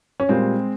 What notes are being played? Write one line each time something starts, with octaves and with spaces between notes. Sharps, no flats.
C#4
A#2 G3 G#3 C4